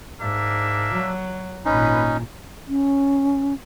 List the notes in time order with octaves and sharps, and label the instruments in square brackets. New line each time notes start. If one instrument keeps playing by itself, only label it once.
[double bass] G#2 [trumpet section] A#3 D4 E5
[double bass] F#3
[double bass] G#1 A#2 [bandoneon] C#4 D#4 [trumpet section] B4
[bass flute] C#4